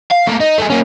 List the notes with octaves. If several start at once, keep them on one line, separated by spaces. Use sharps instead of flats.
F5
A3 A#3
D#4
A3 G#4
A#3 C#4